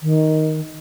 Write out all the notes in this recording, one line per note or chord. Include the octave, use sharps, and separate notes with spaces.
D#3